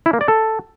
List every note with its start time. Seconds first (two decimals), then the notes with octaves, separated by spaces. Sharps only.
0.06 E4
0.13 A#3
0.21 D5
0.28 A4